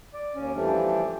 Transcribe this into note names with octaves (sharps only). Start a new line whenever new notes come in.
D5
D#2 C#4
E3 F3 G3 A3 D4